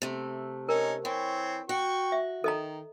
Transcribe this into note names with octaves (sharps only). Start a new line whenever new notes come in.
C3 A3
C#4 D#4 A#4
E3 C4 C#5
F#4 G5 C#6
E5
D#3 A4 D#5 A#5